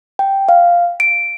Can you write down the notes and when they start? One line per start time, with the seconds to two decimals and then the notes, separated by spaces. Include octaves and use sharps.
0.19 G5
0.49 F5
1.00 D7